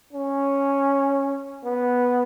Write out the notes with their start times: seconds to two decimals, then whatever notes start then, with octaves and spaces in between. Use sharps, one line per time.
0.13 C#4
1.64 B3